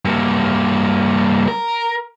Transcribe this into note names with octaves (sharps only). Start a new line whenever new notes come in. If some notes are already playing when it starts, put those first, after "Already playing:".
G2 A#3
A#4